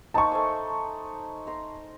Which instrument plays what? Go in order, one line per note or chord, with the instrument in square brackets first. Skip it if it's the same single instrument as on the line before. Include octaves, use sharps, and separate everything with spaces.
[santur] A#3 D#4 C5 [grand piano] A5 C#6
[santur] A3 C5 G#5
A#5 C6